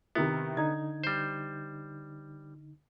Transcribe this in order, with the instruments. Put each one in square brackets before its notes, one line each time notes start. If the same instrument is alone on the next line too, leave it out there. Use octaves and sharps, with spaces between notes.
[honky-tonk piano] C3 D#3 E4 [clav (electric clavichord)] B3
[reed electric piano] D3 D#4 [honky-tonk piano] G#6
[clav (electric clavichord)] G3 C5